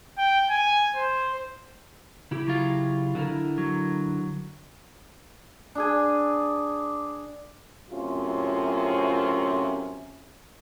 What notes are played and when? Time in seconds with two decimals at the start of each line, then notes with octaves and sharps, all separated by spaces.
0.18 G5
0.50 G#5
0.96 C5
2.31 C#3 E4 G4
2.47 F#3 F4
3.15 D3 E4 A#4
3.58 F#3
5.75 D4 G#4 G#5
7.90 F#2 A2 C3 C#4 F4